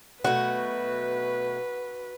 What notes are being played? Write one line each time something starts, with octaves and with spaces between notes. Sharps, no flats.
B2 F#3 A3 F#4 B4